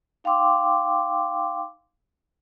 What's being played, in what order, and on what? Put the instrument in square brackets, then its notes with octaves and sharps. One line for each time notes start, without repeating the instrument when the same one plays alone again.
[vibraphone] D#4 F5 G5 C6 D6 E6